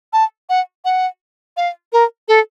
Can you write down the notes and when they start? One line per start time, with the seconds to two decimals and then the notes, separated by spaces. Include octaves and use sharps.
0.13 A5
0.49 F#5
0.85 F#5
1.57 F5
1.93 A#4
2.28 A4